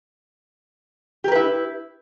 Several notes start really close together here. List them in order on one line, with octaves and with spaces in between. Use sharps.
G4 A#4 B4 E4